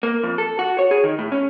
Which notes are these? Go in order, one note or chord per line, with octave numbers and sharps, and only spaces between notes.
A#3
F2
A4
F#4
C#5
G#4
D#3
A2
C#4